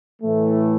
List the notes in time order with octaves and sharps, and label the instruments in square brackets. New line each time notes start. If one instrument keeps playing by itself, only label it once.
[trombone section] A2 E3 A3